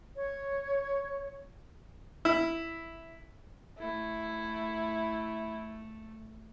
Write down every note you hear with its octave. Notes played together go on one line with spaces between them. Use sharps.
C#5
E4
A3 E4